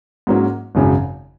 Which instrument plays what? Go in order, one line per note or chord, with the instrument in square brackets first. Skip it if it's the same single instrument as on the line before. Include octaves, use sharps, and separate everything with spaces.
[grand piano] G#2 F#3 A#3 C#4
G#1 F#2 C#3 F#3 C#4